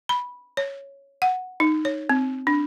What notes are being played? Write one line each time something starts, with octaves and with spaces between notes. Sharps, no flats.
B5
C#5
F#5
D#4
C#5
C4
D4